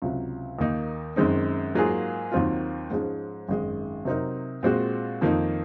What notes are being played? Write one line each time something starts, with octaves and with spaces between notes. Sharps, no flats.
C#2 C3 F#3
D#2 D#3 A#3 D#4
F#2 D#3 G#3 C4 D#4
G#2 F#3 A#3 F4 G#4
D#2 D#3 F#3 C4 F4
G#2 F3 G#3 C#4
G#1 F#2 D#3 G#3
C3 F#3 C4 D#4 A#4
A#2 G#3 C4 F#4
F2 D#3 A#3 D#4